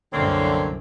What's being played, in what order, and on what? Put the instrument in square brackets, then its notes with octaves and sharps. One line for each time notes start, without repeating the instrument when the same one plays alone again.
[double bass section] C2 F#2 [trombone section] D3 [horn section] A#3 C4 [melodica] C#5